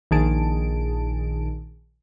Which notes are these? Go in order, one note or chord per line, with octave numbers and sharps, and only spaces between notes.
A#1 D#3 G#4 A5 D7